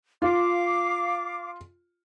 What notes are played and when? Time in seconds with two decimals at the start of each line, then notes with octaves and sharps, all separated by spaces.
0.22 F4 F5 D6